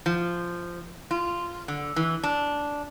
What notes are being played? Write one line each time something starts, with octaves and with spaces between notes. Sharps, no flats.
F3
F4
D3
E3
D4